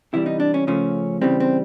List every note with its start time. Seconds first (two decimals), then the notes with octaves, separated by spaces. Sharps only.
0.13 C3 E3 G3 E4
0.26 D#4
0.40 D4
0.54 C#4
0.67 C#3 F3 A3 C#4
1.22 C#3 E3 G3 C4
1.40 C4